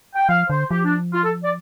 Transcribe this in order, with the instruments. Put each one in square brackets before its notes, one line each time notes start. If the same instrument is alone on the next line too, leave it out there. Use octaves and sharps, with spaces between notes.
[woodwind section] G5
[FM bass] F3 [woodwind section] F5
[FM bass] D3 [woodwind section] C5
[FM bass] F3 [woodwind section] G4
[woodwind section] D4
F4
A4
D5